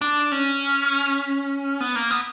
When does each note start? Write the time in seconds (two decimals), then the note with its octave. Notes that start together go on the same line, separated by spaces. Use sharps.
0.01 D4
0.32 C#4
1.81 B3
1.96 A#3
2.11 B3